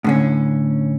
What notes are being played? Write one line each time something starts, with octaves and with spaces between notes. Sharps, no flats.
A2 D3 C#4